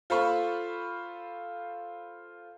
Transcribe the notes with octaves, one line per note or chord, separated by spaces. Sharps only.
F4 A4 C5 F5 B5 C#6